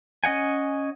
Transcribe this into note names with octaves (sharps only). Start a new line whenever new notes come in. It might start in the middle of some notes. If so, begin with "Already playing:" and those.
C#4 D#5 F#5 G#5